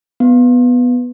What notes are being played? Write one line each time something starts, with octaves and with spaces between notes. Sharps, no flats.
B3